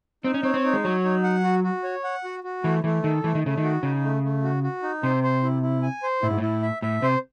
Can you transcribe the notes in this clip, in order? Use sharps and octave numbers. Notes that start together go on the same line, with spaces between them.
C4 D#4
C#4
C4 C#5
C4
D#4
G#3
F#3 C#5
D#4
F#5
F#4
F#4
C#5
F#5
F#4
F#4
E3 A3
E3 A3
D#3 A4
E3 A3
D#3
C#3 A3
D#3
F#4
C#3 D#4
A3
A3
F#4
F#4
D#4
C3 C5
C5
E4
E4
G#5
C5
A2 E4
G#2
A2 E4
E5
A2 E5
C3 C5